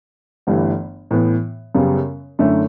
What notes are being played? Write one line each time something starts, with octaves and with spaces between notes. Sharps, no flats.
G1 G2 E3 A3
A2 E3 B3
F#2 C#3 G3 B3
F#2 D3 A3 C#4 E4